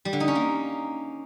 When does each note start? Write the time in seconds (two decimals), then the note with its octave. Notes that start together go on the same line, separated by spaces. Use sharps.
0.05 G3
0.13 D3
0.20 D#4
0.28 C#4
0.35 A#3